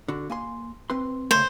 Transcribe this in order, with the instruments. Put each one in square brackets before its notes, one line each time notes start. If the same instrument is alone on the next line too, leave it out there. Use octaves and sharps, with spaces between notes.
[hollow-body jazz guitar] D3 F#4
A#3 G#5 C6
C4 B4 C6
[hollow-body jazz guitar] C#3 A3 [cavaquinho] C5